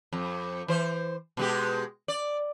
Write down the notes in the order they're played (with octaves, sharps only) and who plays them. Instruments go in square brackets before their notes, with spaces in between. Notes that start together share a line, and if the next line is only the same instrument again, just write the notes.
[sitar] F2
E3 C5
B2 G#3 G4
D5